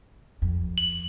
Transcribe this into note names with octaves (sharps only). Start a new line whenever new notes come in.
F2
F#7